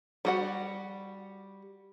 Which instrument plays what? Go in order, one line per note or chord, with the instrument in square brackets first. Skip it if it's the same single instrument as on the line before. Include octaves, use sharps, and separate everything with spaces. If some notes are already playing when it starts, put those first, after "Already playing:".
[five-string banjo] G3 F#4 F#5